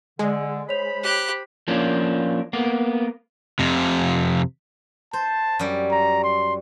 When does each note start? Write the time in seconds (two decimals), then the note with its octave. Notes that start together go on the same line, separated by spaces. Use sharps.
0.19 D3 G#3 D5 G#5
0.69 C5 C#5 B5 F7
1.03 G4 F#6
1.68 F3 A#3 C#4 D4
2.53 A#3 B3
3.59 F2 C3
5.13 C5 A5
5.59 F#2 G3
5.91 A#5
6.24 C6